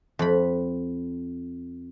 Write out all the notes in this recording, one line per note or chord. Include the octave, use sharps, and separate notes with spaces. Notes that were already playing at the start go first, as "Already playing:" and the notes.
F2 B5